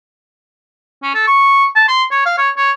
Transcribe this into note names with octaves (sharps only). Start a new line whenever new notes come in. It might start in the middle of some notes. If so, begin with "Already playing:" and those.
C#4
A4
C#6
A5
C6
C#5
F5
C#5
C#5